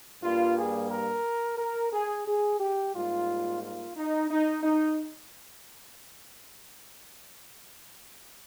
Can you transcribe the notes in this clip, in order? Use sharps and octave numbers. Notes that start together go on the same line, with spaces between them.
G2 G3 A#3 F4
G#4
A#4
A#4
G#4
G#4
G4
G#2 G3 A#3 F4
F4
D#4
D#4
D#4